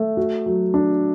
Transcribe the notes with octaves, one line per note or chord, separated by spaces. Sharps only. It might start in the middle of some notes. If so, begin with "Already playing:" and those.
Already playing: A3
F#4
F#3
D4